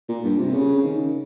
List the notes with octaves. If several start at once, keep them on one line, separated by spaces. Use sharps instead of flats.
A#2
G2
C3
C#3
D#3